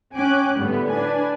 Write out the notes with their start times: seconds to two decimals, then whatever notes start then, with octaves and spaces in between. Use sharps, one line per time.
0.13 C#4 G5 G#5 D6 F#6
0.58 A2 D3 G3 B3
0.89 D4 B4 G#5